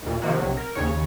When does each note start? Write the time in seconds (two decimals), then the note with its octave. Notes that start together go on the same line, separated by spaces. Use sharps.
0.02 D#2 A#2
0.22 C3 D#3 F3 A#3 F#4
0.37 B1 C3 F#3
0.57 A#4
0.75 D#2 C#3 C#5